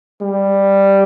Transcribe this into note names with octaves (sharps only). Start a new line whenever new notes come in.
G3